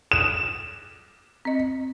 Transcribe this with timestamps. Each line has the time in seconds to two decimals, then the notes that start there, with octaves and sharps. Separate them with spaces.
0.12 D#6 F#6 E7
1.45 C4 D#5